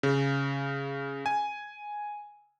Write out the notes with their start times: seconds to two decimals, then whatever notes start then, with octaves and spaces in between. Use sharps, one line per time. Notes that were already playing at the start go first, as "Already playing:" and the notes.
0.03 C#3
1.26 G#5